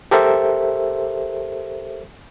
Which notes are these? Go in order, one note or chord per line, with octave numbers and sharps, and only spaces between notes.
G4 A4 A#4 C5 E5